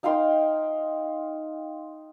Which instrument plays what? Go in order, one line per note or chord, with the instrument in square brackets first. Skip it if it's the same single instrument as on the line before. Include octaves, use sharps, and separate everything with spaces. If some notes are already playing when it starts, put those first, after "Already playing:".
[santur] D#4 F5 G5 C6